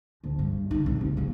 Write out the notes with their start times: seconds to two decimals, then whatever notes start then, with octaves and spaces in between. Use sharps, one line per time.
0.24 D2 F3
0.39 G2
0.71 D3 D#4
0.86 A#1 F2
1.01 F#1
1.17 G#1 A#3